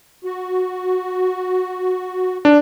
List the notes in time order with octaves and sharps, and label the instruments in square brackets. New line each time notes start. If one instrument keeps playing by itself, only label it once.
[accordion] F#4
[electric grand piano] D4